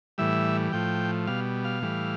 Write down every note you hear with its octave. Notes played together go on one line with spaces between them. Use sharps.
A2 E3 G3 E5
A2 F3 G5
B2 G3 F5
F5
A2 E3 G3